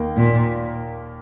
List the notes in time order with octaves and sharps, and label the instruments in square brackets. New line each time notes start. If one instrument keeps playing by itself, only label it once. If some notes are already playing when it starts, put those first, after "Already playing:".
Already playing: [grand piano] D#2 D#3 A#3
[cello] A#2